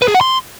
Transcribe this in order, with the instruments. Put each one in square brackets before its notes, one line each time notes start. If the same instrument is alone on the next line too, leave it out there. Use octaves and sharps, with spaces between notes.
[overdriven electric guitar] B4
G#4
F#5
C6